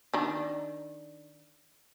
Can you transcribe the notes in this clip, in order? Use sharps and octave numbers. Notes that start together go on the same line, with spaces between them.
D#3 D4